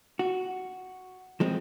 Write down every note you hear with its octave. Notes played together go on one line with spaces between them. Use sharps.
F#4
F3 G#3 C4